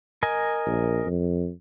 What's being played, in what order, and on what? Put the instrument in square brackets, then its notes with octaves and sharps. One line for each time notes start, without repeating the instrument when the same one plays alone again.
[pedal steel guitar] A#4 D#5 G#5
[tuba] A#1
F2